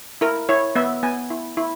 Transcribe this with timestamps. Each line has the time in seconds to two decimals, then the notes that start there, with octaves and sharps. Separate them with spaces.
0.21 E4 A#4
0.49 E4 C#5
0.75 B3 E5
1.03 B3 G#5
1.30 E4
1.57 E4